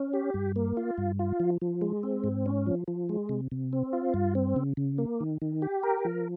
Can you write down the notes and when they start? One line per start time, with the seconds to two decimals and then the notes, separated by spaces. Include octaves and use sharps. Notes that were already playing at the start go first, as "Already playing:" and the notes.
Already playing: C#4
0.13 G4
0.34 G2
0.56 A#3
0.77 F4
0.98 G2
1.19 F4
1.40 F3
1.62 F3
1.81 G#3
2.03 C4
2.24 G#2
2.46 C#4
2.66 F3
2.88 F3
3.09 G#3
3.29 C3
3.52 C3
3.73 C4
3.93 F4
4.14 G2
4.35 C4
4.56 C#3
4.77 C#3
4.98 A#3
5.20 D#3
5.42 D#3
5.62 G4
5.83 A#4
6.05 F3